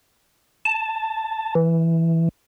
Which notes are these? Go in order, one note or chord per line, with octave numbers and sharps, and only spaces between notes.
A5
E3